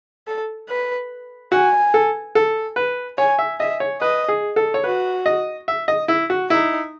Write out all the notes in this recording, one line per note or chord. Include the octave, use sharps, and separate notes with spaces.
A4
B4
F#4 G#5
A4
A4
B4
C#5 G#5
E5
D#5 E5
C#5
B4 D#5
G#4
A4
C#5
F#4 B4
D#5
E5
D#5
E4
F#4
D#4 E4